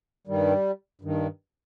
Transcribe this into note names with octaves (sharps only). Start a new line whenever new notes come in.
G2 D#3 G3
G2 D#3